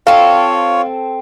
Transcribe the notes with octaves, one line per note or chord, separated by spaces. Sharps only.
C4 F4 A4 C#5 F5